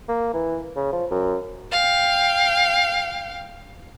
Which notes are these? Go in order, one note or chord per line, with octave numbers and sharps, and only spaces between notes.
A#3
E3
C#3
F3
F#2
F5 G5